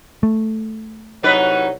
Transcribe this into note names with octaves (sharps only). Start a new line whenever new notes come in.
A3
C2 F#3 D#4 B4 C#5 F#5